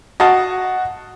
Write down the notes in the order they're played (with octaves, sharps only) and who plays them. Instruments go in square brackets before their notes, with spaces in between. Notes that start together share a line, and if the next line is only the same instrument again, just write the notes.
[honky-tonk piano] F#4 [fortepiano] D#5 F5 A5